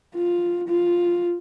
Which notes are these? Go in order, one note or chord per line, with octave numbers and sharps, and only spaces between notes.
F4
F4